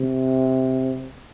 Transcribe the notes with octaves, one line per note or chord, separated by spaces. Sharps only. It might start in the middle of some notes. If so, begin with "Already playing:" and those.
Already playing: C3